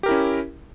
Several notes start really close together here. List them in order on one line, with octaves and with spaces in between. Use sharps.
G4 A#4 E4 C#4